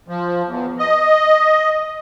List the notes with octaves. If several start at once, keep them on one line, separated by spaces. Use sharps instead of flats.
F3
E2
D#5